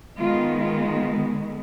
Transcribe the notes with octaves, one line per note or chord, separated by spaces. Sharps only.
D#3 G#3 B3 F4
F4